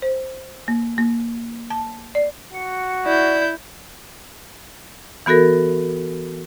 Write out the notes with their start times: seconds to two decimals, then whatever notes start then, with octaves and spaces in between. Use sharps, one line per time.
0.02 C5
0.68 A#3
0.98 A#3
1.70 A5
2.15 D5
2.54 F#4 C#7
3.06 E4 D5 G6
5.26 E3 B3 F#4 A4 A#4